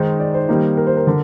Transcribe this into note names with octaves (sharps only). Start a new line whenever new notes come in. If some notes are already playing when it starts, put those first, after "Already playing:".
Already playing: D#3 G#3 D#4 C5
D5
C5
D#3 G3 A#3 D#4
A#4
C5
A#4
D3